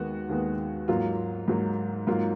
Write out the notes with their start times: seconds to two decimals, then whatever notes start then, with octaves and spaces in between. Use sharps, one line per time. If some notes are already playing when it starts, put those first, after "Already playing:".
Already playing: D#2 D#3 G#3 B3 F#4
0.29 D#2 D#3 G#3 B3
0.88 G#2 F#3 A#3 F4
1.48 G#2 F#3 A#3
2.07 G#2 F#3 A#3 F4